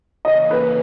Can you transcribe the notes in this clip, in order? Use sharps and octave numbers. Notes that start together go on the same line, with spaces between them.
C#3 E3 A#3 C#4 D#5
B4